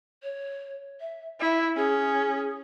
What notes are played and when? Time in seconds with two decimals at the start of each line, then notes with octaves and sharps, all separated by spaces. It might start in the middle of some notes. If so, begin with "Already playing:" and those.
0.23 C#5
1.01 E5
1.40 E4 E5
1.76 C#4 G#4